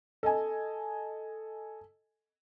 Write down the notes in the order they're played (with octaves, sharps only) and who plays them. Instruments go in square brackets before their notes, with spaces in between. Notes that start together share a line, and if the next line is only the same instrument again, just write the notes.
[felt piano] A4 D#5 G#5